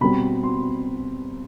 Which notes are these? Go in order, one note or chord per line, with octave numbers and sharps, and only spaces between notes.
B2 G3 C4 B5
C6